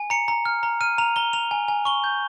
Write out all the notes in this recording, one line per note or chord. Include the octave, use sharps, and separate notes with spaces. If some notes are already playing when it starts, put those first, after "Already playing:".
Already playing: G#5
A#5 C#7
A#5
F6
A#5
F6 D#7
A#5 F7
A#5 G7
A#5 F7
G#5
G#5
C#6 G7
G6